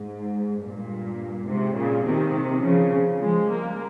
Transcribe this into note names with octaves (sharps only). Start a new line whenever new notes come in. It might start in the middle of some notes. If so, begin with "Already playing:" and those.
Already playing: G#2
G2 A#2
G#2 C3
A#2 C#3
C3 D#3
C#3 F3
F3 G#3
G3 A#3